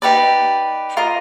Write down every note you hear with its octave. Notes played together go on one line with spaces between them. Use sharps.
D#4 G4 B4 D5
F4 A#4 D#5